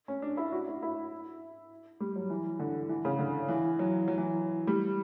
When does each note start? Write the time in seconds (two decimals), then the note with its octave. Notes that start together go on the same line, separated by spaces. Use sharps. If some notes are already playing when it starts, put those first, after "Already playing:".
0.08 C#4
0.22 D4
0.37 E4
0.52 F#4
0.68 E4
0.82 E4
2.00 G3
2.16 F#3
2.30 E3
2.60 D3
2.89 E3
3.05 C#3
3.19 D3
3.48 E3
3.79 F#3
4.08 F#3
4.18 E3
4.67 G3